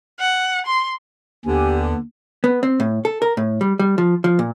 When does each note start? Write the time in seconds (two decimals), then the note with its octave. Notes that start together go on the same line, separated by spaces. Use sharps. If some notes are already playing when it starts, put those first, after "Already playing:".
0.20 F#5
0.66 C6
1.45 D#2 D3 B3 G4 G#5
2.44 B3
2.63 C4
2.80 A2
3.05 A4
3.22 A#4
3.37 A2
3.61 G3
3.79 G3
3.98 F3
4.24 F3
4.39 A#2